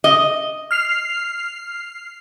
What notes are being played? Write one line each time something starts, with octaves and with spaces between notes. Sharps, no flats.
D#5
F6 C7 F7